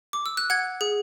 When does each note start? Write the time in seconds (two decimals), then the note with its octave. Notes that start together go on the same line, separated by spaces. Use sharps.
0.13 D6
0.26 E6
0.37 F#6
0.50 F#5 G#6
0.81 G#4